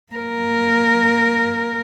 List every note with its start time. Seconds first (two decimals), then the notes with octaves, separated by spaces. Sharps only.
0.12 A#3 A#4